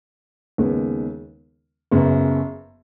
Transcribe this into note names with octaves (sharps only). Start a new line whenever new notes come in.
D#2 C#3 G#3 B3
F#1 F#2 C#3 B3